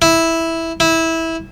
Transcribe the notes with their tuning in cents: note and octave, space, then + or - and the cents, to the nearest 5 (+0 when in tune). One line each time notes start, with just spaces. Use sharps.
E4 -5
E4 -15